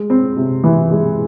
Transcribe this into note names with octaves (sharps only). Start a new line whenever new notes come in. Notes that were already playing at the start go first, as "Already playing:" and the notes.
Already playing: G#3
C4
C3
E3
G#3